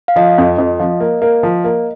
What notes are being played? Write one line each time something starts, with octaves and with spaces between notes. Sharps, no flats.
F5
F3 D#5
F2
F2
F3
A#3
A#3
F3
A#3